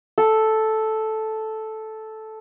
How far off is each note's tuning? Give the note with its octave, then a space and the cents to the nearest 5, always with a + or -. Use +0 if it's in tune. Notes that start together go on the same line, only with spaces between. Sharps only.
A4 -5